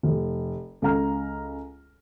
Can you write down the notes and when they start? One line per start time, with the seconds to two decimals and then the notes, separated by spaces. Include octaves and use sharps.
0.03 F1
0.82 C#2 A4 F5 A#5 F6